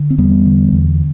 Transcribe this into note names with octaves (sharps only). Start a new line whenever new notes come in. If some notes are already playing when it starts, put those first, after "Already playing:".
Already playing: D3
C4
E2 G3 B3
D3
E2